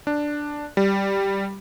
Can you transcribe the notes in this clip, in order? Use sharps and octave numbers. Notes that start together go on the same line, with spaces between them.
D4
G3